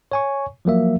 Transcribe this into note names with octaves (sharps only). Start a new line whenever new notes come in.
C#5 G#5 C#6
F3 F#3 A#3 E5